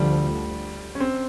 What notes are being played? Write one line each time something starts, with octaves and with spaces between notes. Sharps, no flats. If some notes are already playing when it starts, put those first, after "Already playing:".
Already playing: D2 D3 F3 G3
C#4
C4